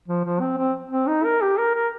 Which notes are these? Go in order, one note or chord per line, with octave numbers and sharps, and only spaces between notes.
F3
F3
C4
C4
C4
D#4
A#4
G4
A#4
A#4